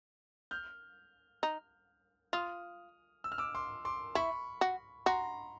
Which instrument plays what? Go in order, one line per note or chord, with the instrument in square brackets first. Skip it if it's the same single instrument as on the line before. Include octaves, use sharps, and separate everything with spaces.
[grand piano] F6 G6
[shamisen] D#4
[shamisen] F4 [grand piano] D#6 F6
[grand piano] E6
F6
D6 E6
C6 D6
C6 D6
[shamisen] E4 [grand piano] B5 C#6
[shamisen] F#4
[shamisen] F#4 [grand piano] A#5 C6